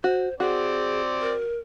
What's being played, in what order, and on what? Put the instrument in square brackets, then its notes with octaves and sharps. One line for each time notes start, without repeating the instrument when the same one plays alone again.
[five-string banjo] F#4 [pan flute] C5
[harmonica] C4 D5 [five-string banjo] F#4 [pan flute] G#4
[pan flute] A#4